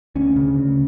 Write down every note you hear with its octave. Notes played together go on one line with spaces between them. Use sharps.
D2 C#4
C#3
D2